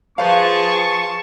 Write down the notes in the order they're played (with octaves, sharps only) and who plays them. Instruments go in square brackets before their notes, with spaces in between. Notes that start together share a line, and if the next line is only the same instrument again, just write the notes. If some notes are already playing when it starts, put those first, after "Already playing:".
[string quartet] F3 F4 G#4 [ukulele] B4 C5 F5 [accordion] A5 [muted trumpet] C#6